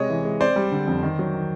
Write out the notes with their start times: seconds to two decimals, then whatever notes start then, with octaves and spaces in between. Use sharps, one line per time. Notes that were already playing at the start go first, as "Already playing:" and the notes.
Already playing: C3 G#3 C#5 D#5
0.10 E3
0.25 G#3
0.40 C4 C5 D5
0.56 G3
0.72 D3
0.87 F2
1.03 D#3
1.19 F#3
1.34 D#3